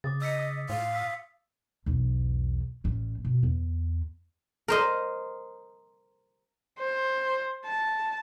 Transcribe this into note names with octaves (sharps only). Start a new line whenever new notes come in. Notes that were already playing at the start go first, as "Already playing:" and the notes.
C#3 D6 D#6 A6
D#5 E6 B6 C#7
D#6
A2 F5
D#6 E6 B6
B1 E2
A1 C#4
B2
E2
A#4 C5 D#5
C5
A5